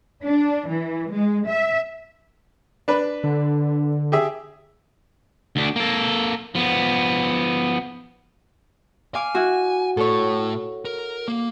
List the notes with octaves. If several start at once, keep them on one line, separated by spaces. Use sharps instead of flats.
D4
E3
G#3
E5
D4 B4 B5
D3
G4 G#4 E5
D2 D4
A#3 A4
F3 B3
F5 G#5 D6
E4 F#4
A2 A4 C#5
A#4
A#3